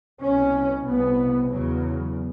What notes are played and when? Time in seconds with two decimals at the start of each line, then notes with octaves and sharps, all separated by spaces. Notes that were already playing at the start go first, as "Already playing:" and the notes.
0.21 C2 B2 C#4
0.85 C2 B2 B3
1.49 E2 C#3 F#3